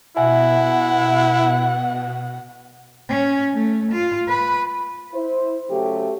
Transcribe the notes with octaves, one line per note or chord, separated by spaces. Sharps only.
B2 E4 E5 F#5 G#5
C#4
A3
F4
B4
E4 C5
C#3 F#3 A3 G4